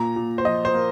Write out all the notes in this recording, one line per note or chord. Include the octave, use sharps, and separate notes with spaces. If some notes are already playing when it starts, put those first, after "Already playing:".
Already playing: A#2 A#5
A#2
C5
F3 D#5
C5
A#3